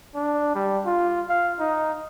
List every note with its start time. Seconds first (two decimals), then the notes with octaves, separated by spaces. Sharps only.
0.15 D4
0.55 G3
0.86 F4
1.29 F5
1.60 D#4